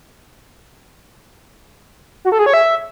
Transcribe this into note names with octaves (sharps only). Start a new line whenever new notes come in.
F#4
A4
G#4
C#5
E5